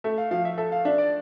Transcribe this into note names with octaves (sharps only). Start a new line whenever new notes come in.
A3 E5
F5
F3 F5
E5
A4 E5
F5
D4 E5
D5